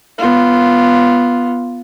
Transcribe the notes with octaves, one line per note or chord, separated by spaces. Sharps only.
B3 F4